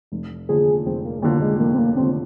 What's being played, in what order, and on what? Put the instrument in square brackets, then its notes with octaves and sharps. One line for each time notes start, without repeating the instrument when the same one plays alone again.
[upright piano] F1
[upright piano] D#2 D3 F3 [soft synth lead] G#4
[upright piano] F1 [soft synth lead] C4
[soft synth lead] A#3
G#3
[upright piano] D#2 D3 F3 [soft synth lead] A#3
[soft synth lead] G#3
[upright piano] F1 [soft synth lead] A#3
[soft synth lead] C4
A#3
[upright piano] D#2 D3 F3 [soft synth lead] C4